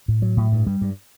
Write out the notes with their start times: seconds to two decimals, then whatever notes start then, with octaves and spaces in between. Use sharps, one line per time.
0.08 A2
0.22 F#3
0.37 A2
0.52 G2
0.67 G3
0.81 G2